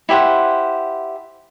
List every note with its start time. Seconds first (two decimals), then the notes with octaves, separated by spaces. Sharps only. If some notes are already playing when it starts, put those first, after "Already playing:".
0.09 E4 G4 C5 F#5